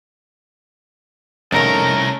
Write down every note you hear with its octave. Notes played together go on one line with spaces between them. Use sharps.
C2 F2 G#2 D#3 A3 C#4 A#4 A#5